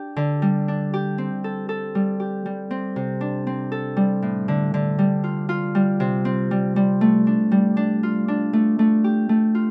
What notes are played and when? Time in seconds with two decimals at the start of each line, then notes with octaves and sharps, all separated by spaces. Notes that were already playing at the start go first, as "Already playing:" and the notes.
Already playing: D4 G4
0.16 D3
0.42 G3
0.68 D4
0.94 G4
1.18 C4
1.44 A4
1.69 A4
1.95 G3
2.20 G4
2.46 G3
2.71 C4
2.96 C3
3.21 D4
3.47 C4
3.72 A4
3.97 G3
4.22 A2
4.48 D3
4.74 D3
4.99 G3
5.24 F4
5.49 F4
5.75 G3
6.00 C3
6.25 C4
6.51 G3
6.76 G3
7.01 A3
7.27 D4
7.52 G3
7.77 D4
8.03 F4
8.28 D4
8.53 A3
8.79 A3
9.04 G4
9.29 A3
9.55 F4